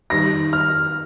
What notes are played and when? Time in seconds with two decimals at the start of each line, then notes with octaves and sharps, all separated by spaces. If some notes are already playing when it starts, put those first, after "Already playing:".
0.10 D#3 G3 D#4 G4 A#6
0.53 F6